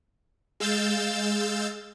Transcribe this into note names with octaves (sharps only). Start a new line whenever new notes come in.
G#3 F5 E6 G6 A6